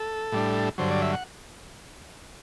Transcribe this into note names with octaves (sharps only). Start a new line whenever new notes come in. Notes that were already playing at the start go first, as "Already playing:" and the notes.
Already playing: A4
A2 G3 D4
G2 D3 F#3 C5
D5
E5
F#5